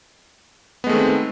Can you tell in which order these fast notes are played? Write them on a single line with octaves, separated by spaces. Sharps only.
B3 G#3 A3 D#3 C4